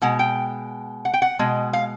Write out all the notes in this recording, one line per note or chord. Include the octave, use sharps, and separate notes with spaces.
B2 G#3 F#5
G5
F#5
G5
F#5
B2 G#3
F5